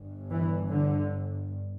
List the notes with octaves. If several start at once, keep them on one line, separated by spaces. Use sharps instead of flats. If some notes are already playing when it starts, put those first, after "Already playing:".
Already playing: G1 G2
E3
D3